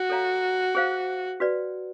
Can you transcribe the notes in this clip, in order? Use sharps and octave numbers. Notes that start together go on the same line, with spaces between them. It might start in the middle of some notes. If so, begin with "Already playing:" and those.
Already playing: F#4
A4 C#5 F5 A#5
G#4 C5 F5
F#4 B4 D5